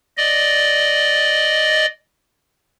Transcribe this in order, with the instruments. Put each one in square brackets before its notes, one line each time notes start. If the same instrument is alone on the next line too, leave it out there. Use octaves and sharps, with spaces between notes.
[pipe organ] D5 D#5